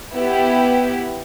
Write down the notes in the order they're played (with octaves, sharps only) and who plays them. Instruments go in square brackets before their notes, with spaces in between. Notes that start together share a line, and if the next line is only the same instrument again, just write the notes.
[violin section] B3 E4 G4